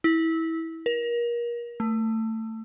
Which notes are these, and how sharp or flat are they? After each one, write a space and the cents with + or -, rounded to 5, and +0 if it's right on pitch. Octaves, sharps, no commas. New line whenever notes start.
E4 -20
A#4 +30
A3 +20